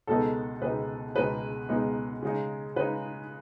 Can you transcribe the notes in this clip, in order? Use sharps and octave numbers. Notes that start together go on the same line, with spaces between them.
C#2 B2 G#3 B3 D#4 A4
C#2 B2 G#3 B3 D#4 B4
C#2 B2 G#3 B3 D#4 B4
C#2 B2 G#3 B3 D#4
C#3 G#3 D#4
C#3 G#3 D#4 B4